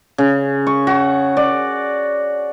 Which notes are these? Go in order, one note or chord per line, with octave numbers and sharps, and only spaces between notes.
C#3
C#6
F#4
D5